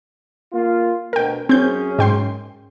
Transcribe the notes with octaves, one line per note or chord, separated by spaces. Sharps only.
A#3 F4
D2 B2 A#4 G5
F#2 C4 C#4 G#4 G6
G#2 G5 C6